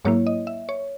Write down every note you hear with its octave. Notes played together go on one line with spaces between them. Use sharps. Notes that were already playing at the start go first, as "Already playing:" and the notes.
G#2 F#3 A#3 E4 C#5
D#5
E5
C#5